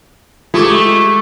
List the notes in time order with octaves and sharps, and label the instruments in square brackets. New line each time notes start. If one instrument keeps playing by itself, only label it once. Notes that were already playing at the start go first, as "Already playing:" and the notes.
[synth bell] G#3 G4 D6 [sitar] A3 [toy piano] F4